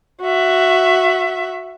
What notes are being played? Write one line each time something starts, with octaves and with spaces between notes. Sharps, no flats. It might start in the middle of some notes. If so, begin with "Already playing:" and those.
F#4 E5